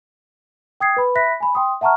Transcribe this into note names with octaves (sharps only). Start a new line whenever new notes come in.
G5 D#6 G#6 C7
B4 B5
E5 B5 F#6 A#6 B6
G#5 B5
G5 C6 D#6
E5 F#5 A5 A#5 C#6 F6